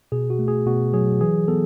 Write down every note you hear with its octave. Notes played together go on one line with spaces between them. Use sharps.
B2 G#4
F#4
A3
G#4
B2 F#4
F#3 G#4
E3 G#4
B3 A4